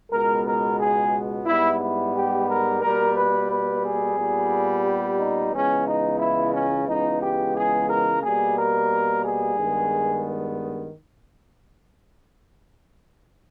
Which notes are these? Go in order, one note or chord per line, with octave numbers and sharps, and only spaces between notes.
C#2 B2 G#3 B3 A#4
A#4
G#4
G#2 G3 B3 E4
E4
G4
A#4
B2 G3 A#3 A#4
B4
B4
G#4
A#2 G3 B3
G4
D#4
C#2 C#3 E3 G#3 B3 C#4
D#4
E4
C#4
C#2 C#3 E3 G#3 B3 D#4
G4
G#4
A#4
B2 G3 A#3 G#4
A#4
G#4
G2 D#3 G#3 B3